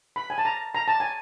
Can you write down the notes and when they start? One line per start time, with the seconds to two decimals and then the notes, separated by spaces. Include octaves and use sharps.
0.16 B5
0.30 G#5
0.38 A5
0.45 A#5
0.75 A#5
0.88 A5
1.00 G#5